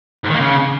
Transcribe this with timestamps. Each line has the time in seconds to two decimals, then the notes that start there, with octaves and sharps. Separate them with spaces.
0.24 G#2
0.29 D#3
0.34 A#3
0.40 C#3